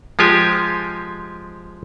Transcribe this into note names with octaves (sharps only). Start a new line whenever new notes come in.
F3 G#3 F4 G4 G#5